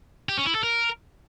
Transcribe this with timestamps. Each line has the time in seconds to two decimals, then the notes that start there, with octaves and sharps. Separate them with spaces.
0.29 G4
0.38 C#4
0.46 E4
0.55 A4
0.63 A#4